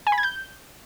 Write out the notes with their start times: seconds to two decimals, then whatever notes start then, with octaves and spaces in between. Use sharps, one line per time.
0.07 G#5
0.12 B5
0.18 G#6
0.23 G6